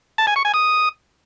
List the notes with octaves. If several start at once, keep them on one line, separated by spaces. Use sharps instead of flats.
A5
G#5
C#6
G#5
D#6